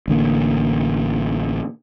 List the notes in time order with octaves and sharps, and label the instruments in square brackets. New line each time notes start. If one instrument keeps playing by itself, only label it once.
[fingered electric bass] A1 D3 A#3